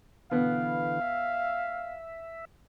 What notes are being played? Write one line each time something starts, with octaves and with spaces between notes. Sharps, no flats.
B2 D3 E3 B3 B4 F5
E5